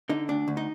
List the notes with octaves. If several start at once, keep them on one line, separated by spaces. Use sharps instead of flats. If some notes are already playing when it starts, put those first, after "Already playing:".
D3 D#4
D2 D4
D2
D#4